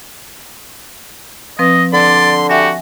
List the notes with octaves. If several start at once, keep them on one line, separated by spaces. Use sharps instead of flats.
F3 C4 B4 D#5
D3 D5 C6
F#4 G4 E5 F#5 G#5